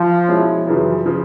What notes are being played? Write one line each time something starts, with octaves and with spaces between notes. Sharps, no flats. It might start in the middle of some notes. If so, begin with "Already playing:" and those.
Already playing: F3
B2 G#3 C#4 E4
F#2 C#3 E3 F3
C#3 F3